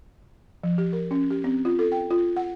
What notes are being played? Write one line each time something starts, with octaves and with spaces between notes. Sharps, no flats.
F3
G4
A#4
C#4
G4
C4
F4
A4
G5
F4
F#5